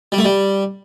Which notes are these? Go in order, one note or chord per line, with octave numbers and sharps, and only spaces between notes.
G3
A3
G3